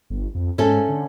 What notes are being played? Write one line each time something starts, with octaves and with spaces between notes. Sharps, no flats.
G1
F2
G#2 A3 C#4 A4
D3